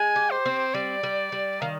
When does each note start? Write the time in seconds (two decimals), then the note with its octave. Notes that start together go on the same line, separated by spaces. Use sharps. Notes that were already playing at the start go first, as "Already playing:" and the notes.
Already playing: G#3 G#5
0.16 G4
0.31 C5
0.46 C4
0.74 G3 D5
1.03 G3
1.32 G3
1.61 D#3 F5